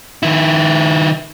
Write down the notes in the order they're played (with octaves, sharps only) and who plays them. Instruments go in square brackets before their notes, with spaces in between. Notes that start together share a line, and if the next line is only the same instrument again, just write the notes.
[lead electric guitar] D#3 E4